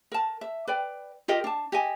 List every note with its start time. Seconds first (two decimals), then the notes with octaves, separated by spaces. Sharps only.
0.12 A#4 A5
0.41 E5
0.67 B4 D5 G5
1.28 F4 G4 A#4 D#5
1.44 D4 A5
1.72 G4 D#5 G#5